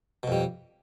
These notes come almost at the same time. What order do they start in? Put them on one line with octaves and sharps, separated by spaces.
B2 F2 G3